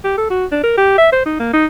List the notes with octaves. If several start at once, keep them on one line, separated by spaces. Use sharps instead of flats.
G4
A4
F#4
D4
A#4
G4
E5
C5
D#4
A#3
D#4